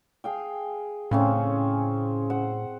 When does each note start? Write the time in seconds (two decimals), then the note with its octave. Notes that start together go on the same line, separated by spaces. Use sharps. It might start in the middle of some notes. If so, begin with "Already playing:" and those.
0.24 G#4 F5 G5
1.11 A2 C#3 C4 C#4
2.30 C5 F#5